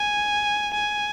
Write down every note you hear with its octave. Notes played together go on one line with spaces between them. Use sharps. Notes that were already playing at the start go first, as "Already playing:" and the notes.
Already playing: G#5
G#5